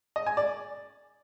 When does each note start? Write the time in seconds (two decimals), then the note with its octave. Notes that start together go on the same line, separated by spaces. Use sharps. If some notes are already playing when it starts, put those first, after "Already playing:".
0.16 D#5
0.26 G#5
0.37 D5